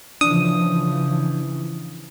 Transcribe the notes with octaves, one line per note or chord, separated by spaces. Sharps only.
C#3 E3 F3 D4 D#6